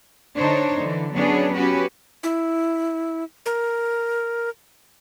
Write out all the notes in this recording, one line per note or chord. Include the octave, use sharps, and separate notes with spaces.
D3 D4 D#4 C5 C#5
D3 E3
F#3 B3 C#4 D4 G#4 C#5
B3 C#4 F#4 G4 B4
E4
A#4